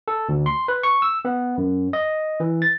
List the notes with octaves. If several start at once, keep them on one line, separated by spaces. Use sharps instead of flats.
A4
D2
C6
B4
C#6
E6
B3
F#2
D#5
E3
A6